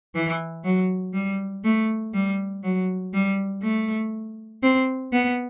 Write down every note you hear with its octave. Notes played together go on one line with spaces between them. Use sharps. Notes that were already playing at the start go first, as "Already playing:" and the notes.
E3
F#3
G3
A3
G3
F#3
G3
A3
C4
B3